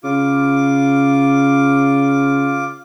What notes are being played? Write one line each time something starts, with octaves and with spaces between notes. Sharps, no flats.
C#3 F4 D6